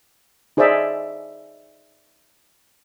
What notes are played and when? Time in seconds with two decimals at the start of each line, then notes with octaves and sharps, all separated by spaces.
0.57 D#4 G#4 C5 D5 E5